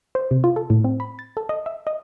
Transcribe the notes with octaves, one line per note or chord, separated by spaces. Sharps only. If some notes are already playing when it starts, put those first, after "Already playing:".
C5
C3
F4
A4
A2
C4
B5
A6
A4
D#5
E5
D#5